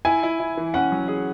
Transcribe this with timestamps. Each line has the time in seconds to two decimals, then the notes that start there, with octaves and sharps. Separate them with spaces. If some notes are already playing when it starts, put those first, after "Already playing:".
0.05 E4 G#5
0.23 E4
0.39 E4
0.57 E3
0.74 C#4 F#5
0.92 F#3
1.08 G#4